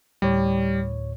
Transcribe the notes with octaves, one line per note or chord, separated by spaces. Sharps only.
D2 A2 G3 C#5